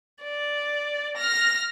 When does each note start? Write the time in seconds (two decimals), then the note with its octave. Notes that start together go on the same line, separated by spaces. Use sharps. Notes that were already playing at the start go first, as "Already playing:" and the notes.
0.23 D5
1.17 F6 A#6